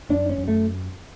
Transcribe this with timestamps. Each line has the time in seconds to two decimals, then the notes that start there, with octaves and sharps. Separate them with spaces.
0.09 F#2 D4
0.29 C#4
0.38 F#2
0.48 A3